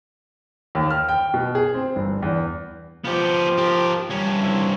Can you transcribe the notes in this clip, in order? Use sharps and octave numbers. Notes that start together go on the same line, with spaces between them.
D#2
F6
G5
B2
G#4
C4
G1
E2
F3 B3 G4
G4 A#4
G2 C#4
C4 E4